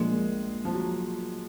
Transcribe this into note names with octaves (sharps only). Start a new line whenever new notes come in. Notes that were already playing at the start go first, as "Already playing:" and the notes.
Already playing: A#1 A#2 F3 G#3 A#3
F3
F#3